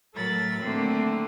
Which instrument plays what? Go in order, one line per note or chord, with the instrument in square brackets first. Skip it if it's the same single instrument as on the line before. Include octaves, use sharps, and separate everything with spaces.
[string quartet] A2 F#3 A4 A#4 B5 A6
D3 D#3 A3 A#3 C4